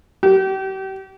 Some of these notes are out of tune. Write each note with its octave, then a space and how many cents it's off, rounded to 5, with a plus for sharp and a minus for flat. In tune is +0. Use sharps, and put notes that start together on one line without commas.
G4 -35